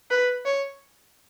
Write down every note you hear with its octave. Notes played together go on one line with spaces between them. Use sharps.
B4
C#5